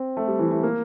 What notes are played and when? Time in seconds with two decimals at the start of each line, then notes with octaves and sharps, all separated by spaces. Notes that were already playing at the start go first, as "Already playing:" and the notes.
Already playing: C4
0.17 A3
0.28 G3
0.39 E3
0.51 A3
0.63 A#3